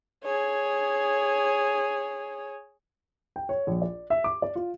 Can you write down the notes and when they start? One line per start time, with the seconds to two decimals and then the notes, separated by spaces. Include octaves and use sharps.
0.24 G#4 C#5
3.36 G5
3.49 C#5
3.67 A#1
3.82 D5
4.10 E5
4.24 D6
4.42 D5
4.56 F4